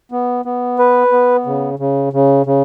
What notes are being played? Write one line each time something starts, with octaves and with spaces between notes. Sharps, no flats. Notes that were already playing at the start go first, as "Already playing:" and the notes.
B3
B3
B4
B3
C#3
C#3
C#3
C#3